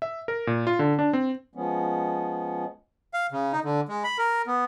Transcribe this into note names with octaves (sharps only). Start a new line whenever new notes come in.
E5
A#4
A#2
F4
D3
D4
C4
F3 G#3 B3 C#4
F5
C#3
D#4
D3
G#3
B5
A#4
B3